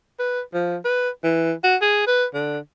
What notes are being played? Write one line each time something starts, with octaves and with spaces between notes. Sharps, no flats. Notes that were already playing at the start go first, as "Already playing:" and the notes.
B4
F3
B4
E3
F#4
G#4
B4
D3